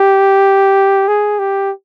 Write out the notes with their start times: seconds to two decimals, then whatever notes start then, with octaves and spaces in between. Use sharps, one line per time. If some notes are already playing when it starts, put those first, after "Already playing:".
Already playing: G4
1.08 G#4
1.39 G4